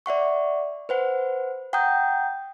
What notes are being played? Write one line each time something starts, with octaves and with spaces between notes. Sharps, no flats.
D5 E5 F#5 C#6
B4 C5 F#5
F#5 G5 A#5 D#6 G6